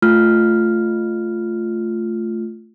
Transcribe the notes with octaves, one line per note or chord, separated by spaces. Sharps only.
A3 F4 F6